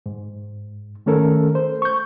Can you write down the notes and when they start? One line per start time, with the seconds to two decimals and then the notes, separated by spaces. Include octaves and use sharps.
0.06 G#2
1.06 D#3 A3 C#4 A4 A#4
1.55 C5
1.82 C#6 G6